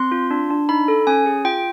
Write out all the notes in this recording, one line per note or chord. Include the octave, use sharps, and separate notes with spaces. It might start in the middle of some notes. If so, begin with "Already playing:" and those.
Already playing: C4 C6
F4
D4
D4
D#4 B5
A4
C#4 G#5
G#4
F4 G5